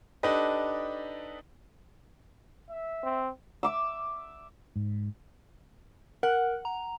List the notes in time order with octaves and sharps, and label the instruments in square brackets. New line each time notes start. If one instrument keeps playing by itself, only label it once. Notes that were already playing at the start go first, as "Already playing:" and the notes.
[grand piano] D4 D#4 G4 A4 B4 D#5
[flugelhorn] E5
[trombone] C4
[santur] E5 D6 E6
[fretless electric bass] G#2
[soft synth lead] A#4 [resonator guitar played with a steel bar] F#5
[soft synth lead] A#5